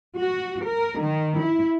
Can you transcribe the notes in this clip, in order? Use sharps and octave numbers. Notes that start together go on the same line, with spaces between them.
F#4
A#4
D#3
E4